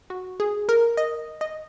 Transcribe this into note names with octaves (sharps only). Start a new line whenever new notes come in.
F#4
G#4
A#4
D#5
D#5